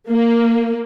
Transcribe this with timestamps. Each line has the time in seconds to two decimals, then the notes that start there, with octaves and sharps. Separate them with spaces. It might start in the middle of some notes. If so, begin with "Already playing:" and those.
0.10 A#3